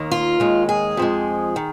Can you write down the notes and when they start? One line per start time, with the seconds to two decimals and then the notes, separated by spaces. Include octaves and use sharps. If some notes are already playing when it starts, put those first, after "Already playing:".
Already playing: D#2 D#3 A#3
0.11 F4
0.40 D#2 D#3 G#3
0.69 G#4
0.97 F2 F3 G#3
1.56 D#3